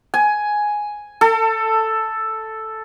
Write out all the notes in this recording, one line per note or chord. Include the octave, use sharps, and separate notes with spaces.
G#5
A4